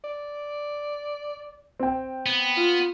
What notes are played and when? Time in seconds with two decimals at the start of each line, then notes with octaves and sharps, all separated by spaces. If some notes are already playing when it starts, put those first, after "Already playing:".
0.04 D5
1.80 C4 G5
2.26 B3
2.57 F4